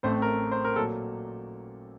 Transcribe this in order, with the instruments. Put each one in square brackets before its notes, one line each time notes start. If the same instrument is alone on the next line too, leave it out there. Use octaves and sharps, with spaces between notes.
[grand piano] A1 A2 A3 C4 C5
A#4
C5
A#4
A#2 F#3 A4